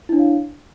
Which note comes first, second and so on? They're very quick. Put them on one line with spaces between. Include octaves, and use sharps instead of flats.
E4 D4 C#5 F5